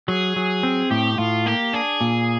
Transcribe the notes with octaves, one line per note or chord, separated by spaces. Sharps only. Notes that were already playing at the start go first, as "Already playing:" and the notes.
F#3 G#4
F#3
C4
A2 G4
A2 F4
A#3 G4
D4 G#4
A#2